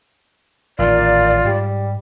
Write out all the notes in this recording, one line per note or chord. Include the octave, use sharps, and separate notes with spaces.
A1 A#2 D#3 F4 D5
G#2 G3